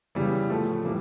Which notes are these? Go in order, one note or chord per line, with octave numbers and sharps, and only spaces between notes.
C#3 E3 G3
A2 F3 A3
E3 G3 A#3